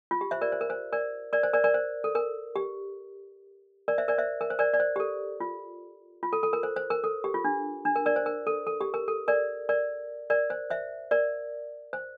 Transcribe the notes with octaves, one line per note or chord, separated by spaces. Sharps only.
F4
G4
C5 E5
A#4 D5
C5
A#4
C5
A#4 D5
A#4 D5
C5
A#4 D5
A#4 D5
C5
A4
A#4
G4
A#4 D5
C5 E5
A#4 D5
C5 E5
A#4
C5
A#4 D5
D5
C5
G4
A4
F4
F4
A4
A4
A#4
C5
C5
A#4
A4
G4
F4
D4
D4
A#4
A#4 D5
C5
A#4
A4
A4
G4
A#4
A4
A#4 D5
A#4 D5
A#4 D5
C5
C5 E5
A#4 D5
C5